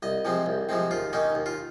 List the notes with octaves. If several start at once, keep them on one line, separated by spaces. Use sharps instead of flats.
C2 D#5
C3 F3 G#3 C4
C2
C3 F3 G#3 C4
D#2 F4
D#3 A#3 C#4 D#4
D#2
F4